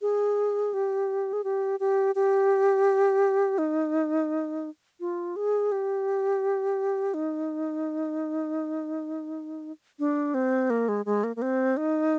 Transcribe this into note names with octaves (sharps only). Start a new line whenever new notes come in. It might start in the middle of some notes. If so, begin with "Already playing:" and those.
G#4
G4
G#4
G4
G4
G4
D#4
F4
G#4
G4
D#4
D4
C4
A#3
G#3
G#3
A#3
A#3
C4
D#4